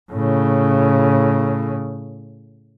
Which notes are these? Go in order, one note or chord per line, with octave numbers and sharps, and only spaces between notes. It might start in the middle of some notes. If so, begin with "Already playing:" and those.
A2 C#3